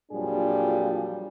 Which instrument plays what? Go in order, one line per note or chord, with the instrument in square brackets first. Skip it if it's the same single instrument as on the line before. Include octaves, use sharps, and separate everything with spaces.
[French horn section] F2 A#2 F#3 G3 D4 G#4